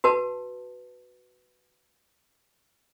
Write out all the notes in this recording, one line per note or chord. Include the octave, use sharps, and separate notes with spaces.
F#4 B4 A5